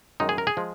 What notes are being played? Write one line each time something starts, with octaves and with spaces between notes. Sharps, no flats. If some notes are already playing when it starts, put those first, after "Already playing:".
F#2 D#3 G#3 D#4
G#4
A#4
G#4
F3 G#3